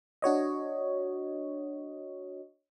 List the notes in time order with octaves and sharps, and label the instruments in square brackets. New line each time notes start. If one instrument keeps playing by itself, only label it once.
[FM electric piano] D4 F#4 C#5 D#5